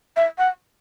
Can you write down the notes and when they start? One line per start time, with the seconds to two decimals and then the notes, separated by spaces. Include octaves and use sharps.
0.16 E5
0.38 F#5